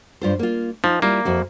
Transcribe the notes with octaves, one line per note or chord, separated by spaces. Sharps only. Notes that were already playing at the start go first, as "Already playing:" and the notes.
G2 F4 C5
A#3 F4
F3 D#4
G3 A#3 E4 F4
F2 F#4 E5